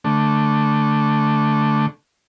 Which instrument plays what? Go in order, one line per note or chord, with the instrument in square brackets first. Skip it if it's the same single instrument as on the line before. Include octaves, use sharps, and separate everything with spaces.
[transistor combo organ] D3 A3